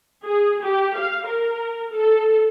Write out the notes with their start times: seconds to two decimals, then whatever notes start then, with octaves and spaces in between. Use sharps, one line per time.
0.25 G#4
0.64 G4
0.97 F5
1.28 A#4
1.92 A4